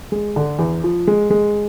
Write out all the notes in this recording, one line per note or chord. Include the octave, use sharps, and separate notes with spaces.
G#3
D3
E2
F3
G#3
G#3